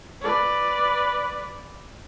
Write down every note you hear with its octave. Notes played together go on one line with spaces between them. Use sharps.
B4 D5